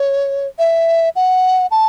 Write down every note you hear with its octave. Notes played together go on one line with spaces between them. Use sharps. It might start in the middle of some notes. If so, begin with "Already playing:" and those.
Already playing: C#5
E5
F#5
A5